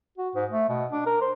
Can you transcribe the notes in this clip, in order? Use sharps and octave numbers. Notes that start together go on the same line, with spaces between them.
F#4
G#2
A3
B2
D4
A#4
C5